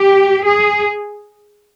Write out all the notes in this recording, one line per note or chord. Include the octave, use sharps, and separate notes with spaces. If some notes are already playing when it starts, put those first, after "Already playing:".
Already playing: G4
G#4